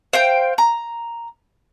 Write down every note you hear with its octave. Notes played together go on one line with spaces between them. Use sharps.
C5 F5 G5
A#5